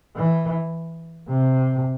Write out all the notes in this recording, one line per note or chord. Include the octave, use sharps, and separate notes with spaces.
E3
C3